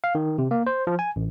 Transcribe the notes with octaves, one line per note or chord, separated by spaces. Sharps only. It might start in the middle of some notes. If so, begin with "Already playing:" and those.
F5
D#3
C3
A#3
C5
F3
G#5
A1